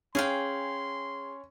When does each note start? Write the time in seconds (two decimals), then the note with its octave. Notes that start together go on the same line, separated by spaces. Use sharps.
0.15 C#4 G#4 F5 G5 C6